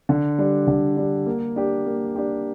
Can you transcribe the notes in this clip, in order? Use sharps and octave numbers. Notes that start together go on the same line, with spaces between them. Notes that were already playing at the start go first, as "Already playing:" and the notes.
D3
G3 D4
D3
G3 D4
A#3
D4 G4
A#3
D4 G4